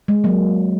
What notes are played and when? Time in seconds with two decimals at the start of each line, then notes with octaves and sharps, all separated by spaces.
0.08 G#3
0.24 F#3 A#3